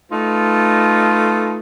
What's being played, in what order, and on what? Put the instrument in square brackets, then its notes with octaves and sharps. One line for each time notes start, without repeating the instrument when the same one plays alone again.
[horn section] A3 D#4 F4 A4 B4